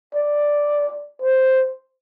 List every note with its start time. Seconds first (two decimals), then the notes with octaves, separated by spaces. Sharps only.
0.14 D5
1.22 C5